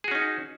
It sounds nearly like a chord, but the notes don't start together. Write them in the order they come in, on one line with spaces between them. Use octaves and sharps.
G#4 F#4 C#4 D#4